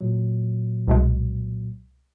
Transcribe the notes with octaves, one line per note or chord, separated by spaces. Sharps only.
A#2 F#3
C2 B2 G#3